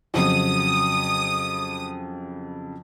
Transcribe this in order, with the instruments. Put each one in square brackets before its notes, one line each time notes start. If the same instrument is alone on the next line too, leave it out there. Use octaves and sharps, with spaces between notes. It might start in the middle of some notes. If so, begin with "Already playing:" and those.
[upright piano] F2 C#3 F#3 [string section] D#6